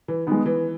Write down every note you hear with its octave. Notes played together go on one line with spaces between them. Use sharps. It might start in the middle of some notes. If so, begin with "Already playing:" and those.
E3
D#3 G#3 B3
E3